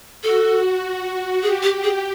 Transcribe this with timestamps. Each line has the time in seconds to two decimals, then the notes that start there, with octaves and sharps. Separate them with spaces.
0.23 F#4 A4
1.43 G4 G#4
1.63 G4
1.83 G#4